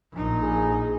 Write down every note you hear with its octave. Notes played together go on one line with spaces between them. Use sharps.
A#1 D#4
G#4